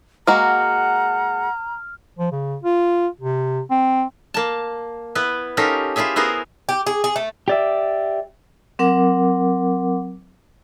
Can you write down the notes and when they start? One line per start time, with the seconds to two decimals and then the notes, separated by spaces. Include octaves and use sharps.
0.27 G#3 A#3 F#4 F#5 A#5 F6
2.19 F3
2.32 C#3
2.63 F4
3.21 C3
3.71 C4
4.34 A#3 A5
5.15 B3 E4 B4
5.57 C#4 D#4 F4 G4 A4 A#4
5.96 E4 F4 G4 G#4 E5
6.16 B3 E4 F#4 G#4 A#4 C5
6.69 G4
6.87 G#4
7.04 G#4
7.16 A3
7.48 G4 D5 E5
8.79 F#3 C4 A#4 F#5 D6